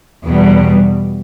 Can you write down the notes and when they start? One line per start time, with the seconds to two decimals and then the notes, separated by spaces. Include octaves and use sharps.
0.25 E2 B2 G3